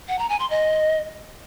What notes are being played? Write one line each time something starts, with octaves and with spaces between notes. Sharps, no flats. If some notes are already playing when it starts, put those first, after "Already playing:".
F#5
A#5
G#5
C6
D#5